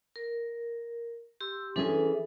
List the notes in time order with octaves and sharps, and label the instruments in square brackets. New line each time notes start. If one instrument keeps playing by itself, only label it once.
[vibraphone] A#4
G4 C6 E6
[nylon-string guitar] E3 C#4 G#4 [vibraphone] D4 A4 B4